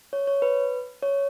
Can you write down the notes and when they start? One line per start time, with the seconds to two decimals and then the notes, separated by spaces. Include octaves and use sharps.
0.13 C#5
0.27 C#5
0.42 B4
1.02 C#5